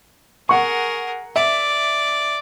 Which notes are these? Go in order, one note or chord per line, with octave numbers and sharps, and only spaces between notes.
G#4 A#4 F#5 C#6
D5 E5